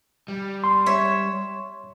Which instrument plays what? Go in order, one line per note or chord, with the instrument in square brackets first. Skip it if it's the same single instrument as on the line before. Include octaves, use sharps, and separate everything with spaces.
[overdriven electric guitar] G3
[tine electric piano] C6
[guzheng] C#5 E5